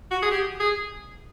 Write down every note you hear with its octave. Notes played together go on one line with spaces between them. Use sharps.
F#4
G#4
G4
G#4